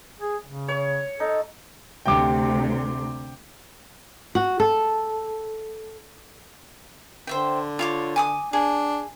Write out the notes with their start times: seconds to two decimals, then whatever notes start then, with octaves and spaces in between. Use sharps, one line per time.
0.20 G#4
0.45 C#3
0.68 C#5
1.20 D#4 A4
2.06 D2 C3 G5 D6
4.35 F#4
4.60 A4
7.27 D3 C5 E5 G5
7.79 F4 C#5 D6
8.16 G#5 D6 D#6
8.53 D4 G#4